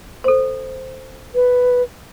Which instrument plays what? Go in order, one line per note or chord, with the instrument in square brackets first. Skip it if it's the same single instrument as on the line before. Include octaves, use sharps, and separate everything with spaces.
[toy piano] A4 C5
[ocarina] B4